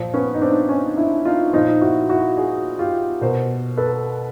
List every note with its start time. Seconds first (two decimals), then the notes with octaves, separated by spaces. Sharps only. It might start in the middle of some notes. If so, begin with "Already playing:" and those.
Already playing: A#2 F3
0.14 B3 C#4
0.34 D#4
0.42 C4 D4
0.69 C#4 D#4
0.97 D4 E4
1.25 D#4 F4
1.53 A#2 F3 D#4 F4
1.81 E4 F#4
2.09 E4 F#4
2.37 F#4 G#4
2.79 F4 G4
3.21 B2 A#4 C5
3.77 A4 B4